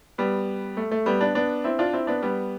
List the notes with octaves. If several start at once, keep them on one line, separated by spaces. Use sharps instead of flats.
G3 B3
A3
A3
G3 B3
B3 D4
B3 D4
C4 E4
D4 F4
C4 E4
B3 D4
G3 B3